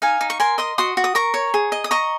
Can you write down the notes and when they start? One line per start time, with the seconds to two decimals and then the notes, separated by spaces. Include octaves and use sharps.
0.02 D#4 F5 G#5
0.21 D#4
0.30 C#6
0.40 A#4 G#5 C6
0.58 D#5 C6 D#6
0.78 F#4 C6 D#6
0.97 F#4
1.04 D#6
1.15 A#4 A#5 C#6
1.34 C#5
1.54 G#4
1.72 D#5
1.84 D#6
1.91 D#5 A#5 C#6